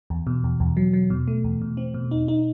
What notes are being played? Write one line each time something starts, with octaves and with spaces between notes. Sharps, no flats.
E2
B2
E2
E2
F#3
F#3
B2
A3
E2
B2
C4
B2
D#4
D#4